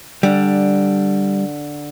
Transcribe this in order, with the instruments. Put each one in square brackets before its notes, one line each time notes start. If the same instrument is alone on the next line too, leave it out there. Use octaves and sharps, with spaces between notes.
[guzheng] D3 [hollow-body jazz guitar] G3